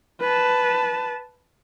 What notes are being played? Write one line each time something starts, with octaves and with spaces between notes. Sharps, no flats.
B4 A5